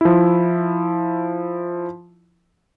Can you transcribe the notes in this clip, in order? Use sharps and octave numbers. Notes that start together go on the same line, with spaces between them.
F3 E4